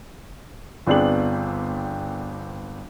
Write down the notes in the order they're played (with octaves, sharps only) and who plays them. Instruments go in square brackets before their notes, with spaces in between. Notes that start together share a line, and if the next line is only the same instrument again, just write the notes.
[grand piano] G1 B3 C4 D4 G#4 F#7